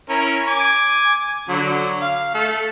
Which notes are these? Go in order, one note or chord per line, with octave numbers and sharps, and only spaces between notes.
C#4 E4 A#4
G#5 D6
D3 F#3
F5
A3 A4